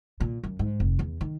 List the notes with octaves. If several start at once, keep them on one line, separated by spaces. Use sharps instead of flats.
A#2
F#2
G#2
F1
E2
D#3